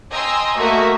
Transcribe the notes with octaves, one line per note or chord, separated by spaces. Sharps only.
D#5 G5 G#5 A#5 C6 E6
A3 A#3 F#4 D#5 E5